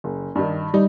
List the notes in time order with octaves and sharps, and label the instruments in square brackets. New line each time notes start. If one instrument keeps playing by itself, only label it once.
[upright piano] F#1
G2 D#3
[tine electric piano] G3 [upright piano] D#4